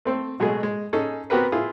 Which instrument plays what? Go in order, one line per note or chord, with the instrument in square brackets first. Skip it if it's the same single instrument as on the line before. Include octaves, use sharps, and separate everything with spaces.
[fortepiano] A3 C4 A4
B2 F#3 G#3 A3 G#4
G#3
C#4 D#4 G#4 A4
B3 C4 F#4 G4 A#4 B4
E4 F4 G#4